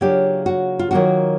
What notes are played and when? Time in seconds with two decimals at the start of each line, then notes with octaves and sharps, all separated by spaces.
0.01 C#3 F#3 A#3 D4 F4 G4
0.46 F#4
0.79 F4
0.91 D#3 F#3 A#3 D4 F4 F#4